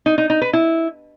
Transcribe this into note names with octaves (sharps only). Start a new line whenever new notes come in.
D#4
D#4
D#4
B4
E4